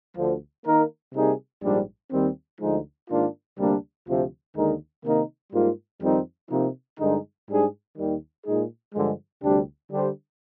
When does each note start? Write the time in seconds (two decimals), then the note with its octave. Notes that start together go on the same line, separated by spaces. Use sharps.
0.17 D2 D3 F3
0.65 D#3 A#3 D#4 A#4
1.14 C3 G3 A#3 D#4 G#4
1.63 A#1 G#2 G3 D4
2.11 D#2 D#3 G3 C4
2.60 D2 D3 F3 G#3 D#4
3.10 G#2 D#3 A#3 D4 F4
3.58 D2 C3 G3 A#3 D4
4.07 D2 C3 F3
4.55 D#2 D3 G#3 D#4 A#4
5.04 C3 D#3 A#3 D#4 A#4
5.52 G#2 G3 A#3 F4
6.01 F2 D#3 G3 C4 D#4
6.50 C3 F3 A#3 D#4
6.99 G2 D3 G#3 D#4
7.48 G#2 G3 D4 G#4
7.96 D#2 D#3 G3
8.46 A#2 G#3 D#4 G#4
8.94 G2 D3 F3 G#3
9.43 D2 C3 G3 D4 G4
9.92 D3 G3 D4 G4 C5